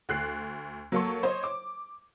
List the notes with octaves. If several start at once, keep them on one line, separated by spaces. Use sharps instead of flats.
D2 F#6 C7
F#3 A#3 A4 C#6
C5 C#5 D#5
D6